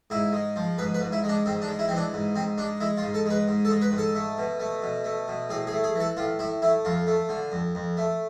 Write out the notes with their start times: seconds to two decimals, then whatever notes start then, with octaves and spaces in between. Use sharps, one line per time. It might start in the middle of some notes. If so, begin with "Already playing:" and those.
0.10 G#2 E4
0.33 G#3
0.56 F3
0.78 G#2 B4
0.94 B4
1.01 G#2
1.12 E4
1.24 G#3
1.29 D4
1.46 G#2 C4
1.62 D4
1.68 G#3
1.79 E4
1.88 E3 C4
1.97 D4
2.13 G#2
2.35 G#2 C4
2.58 G#3 D4
2.80 G#3 E4
2.97 F4
3.02 G#2
3.14 A4
3.26 G#3 B4
3.48 G#2
3.65 A4
3.70 G#3
3.82 B4
3.92 G#2
3.98 A4
4.15 A3
4.38 B2
4.60 A3
4.82 B2
5.04 A3
5.28 B2
5.49 A2 G#4
5.67 G#4
5.72 A3
5.84 G#4
5.95 E3 A4
6.17 A2 F4
6.39 A2 E4
6.62 A3 E4
6.85 F2 F4
7.07 A3
7.29 D3
7.52 F2
7.75 F2
7.97 A3